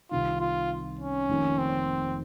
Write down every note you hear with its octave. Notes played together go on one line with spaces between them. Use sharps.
C2 C3 D#3 F4
F4
C#4
F1 F2 D#3 A#3
C4